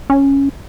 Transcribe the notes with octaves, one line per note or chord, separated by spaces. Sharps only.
C#4